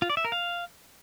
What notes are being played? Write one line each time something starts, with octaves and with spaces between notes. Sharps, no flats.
F4
D5
E5
A#4
F5